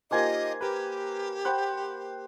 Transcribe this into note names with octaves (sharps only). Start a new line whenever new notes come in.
A#3 D#4 F4 G4 C5 D#5 G#5
G4 A#4 B4
C5 F#5 G5 B5 F#6